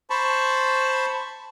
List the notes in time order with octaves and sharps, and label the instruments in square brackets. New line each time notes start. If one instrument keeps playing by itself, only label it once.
[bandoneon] C5 A5 B5 C#6